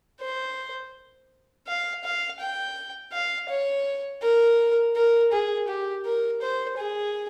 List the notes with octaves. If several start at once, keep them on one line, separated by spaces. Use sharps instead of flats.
C5
F5
F5
G5
F5
C#5
A#4
A#4
G#4
G4
A#4
C5
G#4